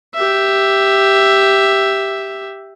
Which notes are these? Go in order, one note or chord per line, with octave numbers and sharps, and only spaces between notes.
G4 E5